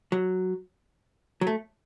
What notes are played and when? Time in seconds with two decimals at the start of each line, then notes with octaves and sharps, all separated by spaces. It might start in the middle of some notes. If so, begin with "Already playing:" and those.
0.12 F#3
1.41 F#3
1.47 A3